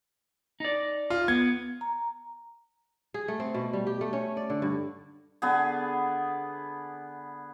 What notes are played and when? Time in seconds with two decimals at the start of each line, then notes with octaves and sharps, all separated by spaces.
0.60 D#4 D5
1.10 F4
1.28 B3 G#6
1.81 A#5
3.14 G#4
3.28 A3
3.40 C4
3.54 B2
3.73 G3
3.87 G4
4.01 A3
4.13 C#4
4.37 D5
4.50 D3
4.62 G2
5.42 D3 B3 G#4